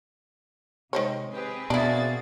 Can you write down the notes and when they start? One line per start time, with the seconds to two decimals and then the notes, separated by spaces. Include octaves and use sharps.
0.93 C3 D#3 G#3 C5 C#5
1.33 C4 G4 G#4 B4
1.70 B2 A#3 D4 E4 F#4 A6